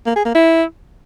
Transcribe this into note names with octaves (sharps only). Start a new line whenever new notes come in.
A#3
G#4
A#3
E4